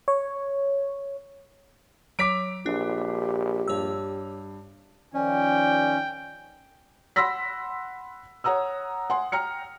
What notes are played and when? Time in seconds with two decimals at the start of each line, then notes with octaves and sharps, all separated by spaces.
0.08 C#5
2.19 F#3 C#5 D6 B6 D7
2.66 A#1 D4 G4
3.68 G2 C#5 E6
5.14 D#3 F3 C#4 D5 G5
7.16 F#5 B5 C6 E6 A#6 B6
8.44 C#5 F#5 A#5 D#6 E6
9.10 F#5 G#5 C6
9.32 G5 A#5 F6 C#7